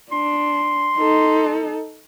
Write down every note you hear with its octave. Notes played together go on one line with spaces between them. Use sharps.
D4 C6
D#4 A4